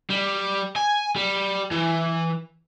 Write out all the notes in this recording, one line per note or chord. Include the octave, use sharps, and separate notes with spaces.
G3
G#5
G3
E3